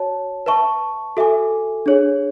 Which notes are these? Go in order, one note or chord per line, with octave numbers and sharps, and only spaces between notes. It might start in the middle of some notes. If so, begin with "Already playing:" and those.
Already playing: F#4 C#5 A5
B4 E5 A5 C#6
F#4 A4 E5 G#5 D6
D4 G#4 C#5